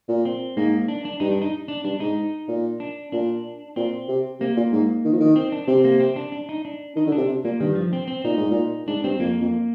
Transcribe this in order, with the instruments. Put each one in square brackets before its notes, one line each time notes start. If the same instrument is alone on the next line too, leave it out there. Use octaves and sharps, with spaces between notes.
[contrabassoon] A#2
[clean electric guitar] C4
[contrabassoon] G#2 [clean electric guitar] A#3
[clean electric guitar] D4
D4
[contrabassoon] G2 [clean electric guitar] D#4
[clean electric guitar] D4
D#4
D4
[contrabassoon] G2 [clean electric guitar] D4
[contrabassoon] G#2 [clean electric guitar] D#4
[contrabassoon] A#2
[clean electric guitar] D4
[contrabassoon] A#2 [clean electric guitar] D4
[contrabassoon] A#2 [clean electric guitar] C4
[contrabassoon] C3
[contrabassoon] C3 [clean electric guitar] A#3
[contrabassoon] A#2
G#2
D#3
F3
D#3
[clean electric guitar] C4
D4
[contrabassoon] C3 [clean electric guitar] C4
[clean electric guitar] A#3
C4
D4
D4
D#4
D4
[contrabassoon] D#3 [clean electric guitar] D#4
[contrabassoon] D3
[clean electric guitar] D4
[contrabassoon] C3
C3
[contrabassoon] A#2 [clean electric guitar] A#3
[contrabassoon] G2 [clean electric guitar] D#3
[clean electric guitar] F3
C4
C4
[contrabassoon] A#2 [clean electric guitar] D#4
[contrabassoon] G#2
A#2
[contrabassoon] G#2 [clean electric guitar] D4
[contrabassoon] G2 [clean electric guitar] C4
[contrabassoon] F2 [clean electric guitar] A#3
[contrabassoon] F2